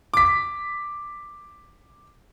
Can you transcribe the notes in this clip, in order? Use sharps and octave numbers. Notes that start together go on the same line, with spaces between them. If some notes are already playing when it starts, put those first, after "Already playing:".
D6 B6